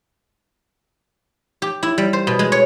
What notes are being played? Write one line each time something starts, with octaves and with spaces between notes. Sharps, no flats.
G4
E4
G3
C5
B2
G#3
C#5